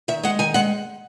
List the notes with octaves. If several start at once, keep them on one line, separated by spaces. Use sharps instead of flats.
D#3 E5
G#3 F#5
D#3 G#5
G#3 F#5